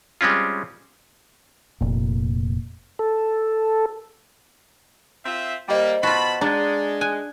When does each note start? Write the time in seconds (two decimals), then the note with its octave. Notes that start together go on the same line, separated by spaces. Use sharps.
0.21 G3 G#3 C4 C#4 F4
1.81 F1 A#2
2.99 A4
5.25 C4 F4 E5
5.68 G3 A#3 C5 D#5 G5
6.03 B2 F4 F#4 A5 B5
6.41 G#3 D4 A#5 A6
7.01 G#5 F#6